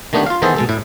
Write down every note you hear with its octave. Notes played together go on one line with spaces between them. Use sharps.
D#3 A3 B3 D4 G4
F4 F5
D#3 E3 B3 G#4 A4 C5
B2 G#3 A4
A2 E4